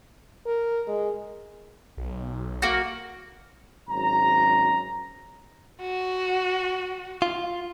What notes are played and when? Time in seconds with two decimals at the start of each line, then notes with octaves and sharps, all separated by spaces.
0.46 A#4
0.87 G#3
1.97 B1
2.62 A#3 F#4
3.90 G#1 F#3 C#4 A#5
5.82 F#4
7.22 F4